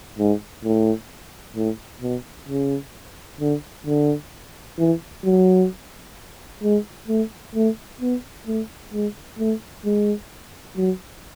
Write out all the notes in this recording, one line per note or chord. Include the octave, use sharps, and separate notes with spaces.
G#2
A2
A2
B2
C#3
D3
D3
E3
F#3
G#3
A3
A3
B3
A3
G#3
A3
G#3
F#3